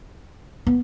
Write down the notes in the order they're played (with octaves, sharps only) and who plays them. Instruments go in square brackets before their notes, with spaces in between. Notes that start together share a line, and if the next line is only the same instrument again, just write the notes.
[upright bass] B3